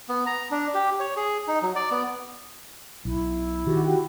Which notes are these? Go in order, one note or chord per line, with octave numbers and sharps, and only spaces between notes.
B3
A#5
D4
G4
C#5
G#4
D#4
F#3
D5
B3
B1 E4
D#3 F#4 G4